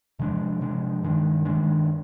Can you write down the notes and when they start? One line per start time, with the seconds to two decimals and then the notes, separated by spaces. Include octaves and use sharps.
0.19 C3 F3 G#3 D4
0.61 C3 F3 G#3 D4
1.03 G2 D#3 G#3 D4
1.45 G2 D#3 G#3 D4